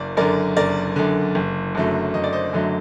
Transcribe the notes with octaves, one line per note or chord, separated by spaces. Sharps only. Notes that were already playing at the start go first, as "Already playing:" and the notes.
Already playing: F#1 A#4 D5
F#2 D3 A#4 D5
F#1 A#4 D5
F#2 D3
F#1
F#2 D3 F#3 A3
F#1 D#5
D5
C5 D#5
F#2 D3 F#3 A3